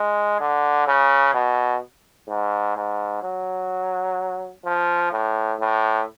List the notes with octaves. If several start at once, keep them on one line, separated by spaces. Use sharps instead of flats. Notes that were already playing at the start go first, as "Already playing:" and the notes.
Already playing: G#3
D3
C#3
B2
G#2
G#2
F#3
F3
A2
A2